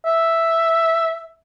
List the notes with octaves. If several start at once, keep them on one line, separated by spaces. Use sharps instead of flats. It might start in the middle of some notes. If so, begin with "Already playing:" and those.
E5